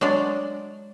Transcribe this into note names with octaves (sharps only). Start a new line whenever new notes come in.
F#3 G#3 D4 D5